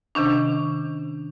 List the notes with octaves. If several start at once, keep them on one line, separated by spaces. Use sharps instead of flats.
C3 D#3 C#4 D4